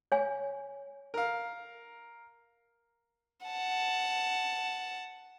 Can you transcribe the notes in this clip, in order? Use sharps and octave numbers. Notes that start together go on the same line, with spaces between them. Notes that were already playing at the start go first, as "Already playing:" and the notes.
C#5 G#5
A#4 F5
F#5 A5